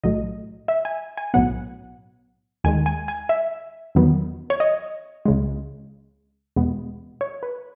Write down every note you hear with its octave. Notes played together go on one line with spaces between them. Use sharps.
B1 A2 F#3 A3 D#5
E5
G#5
G#5
B1 A2 F#3 B3 F#5
D#2 D#3 G#3 G#5
G#5
G#5
E5
E2 D#3 F#3 B3
C#5
D#5
C#2 C#3 G#3
E2 B2 G#3 B3
C#5
B4